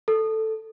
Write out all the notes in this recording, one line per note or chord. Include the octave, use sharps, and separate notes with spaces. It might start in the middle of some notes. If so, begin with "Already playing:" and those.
A4